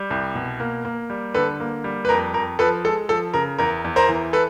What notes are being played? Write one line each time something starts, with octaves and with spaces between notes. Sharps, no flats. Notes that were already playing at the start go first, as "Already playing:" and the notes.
Already playing: G3
C2
B2
A#3
A#3
G3
D3 A4 B4
A#3
G3
B4
F2 A#4
F2 A#4
F3 A4 B4
G#3 A4
F3 A4
C#3 A#4
E2 A#4
E2
A#4 C5
E3
A4 B4